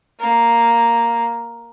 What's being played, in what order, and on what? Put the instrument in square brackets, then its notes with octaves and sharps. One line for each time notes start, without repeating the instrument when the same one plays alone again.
[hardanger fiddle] A#3